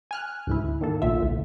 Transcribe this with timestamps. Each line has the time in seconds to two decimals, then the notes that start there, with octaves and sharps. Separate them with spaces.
0.11 G#5 F6 F#6
0.47 D2 G#2 E4
0.81 D#3 A#3 A4
1.02 A#1 A#2 F4 E5
1.20 D2 A2